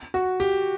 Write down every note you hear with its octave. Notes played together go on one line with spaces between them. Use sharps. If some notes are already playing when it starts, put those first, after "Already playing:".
F#4
G4